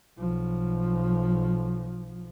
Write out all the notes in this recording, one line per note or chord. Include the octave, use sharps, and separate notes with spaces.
B1 F3